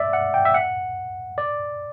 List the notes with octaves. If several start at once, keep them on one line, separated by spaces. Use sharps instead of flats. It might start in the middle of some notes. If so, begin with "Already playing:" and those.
Already playing: D5 E5
F#5
G5
E5
F#5
D5